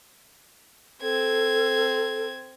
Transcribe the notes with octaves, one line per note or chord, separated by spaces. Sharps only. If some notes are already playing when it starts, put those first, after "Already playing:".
C4 A4 G#6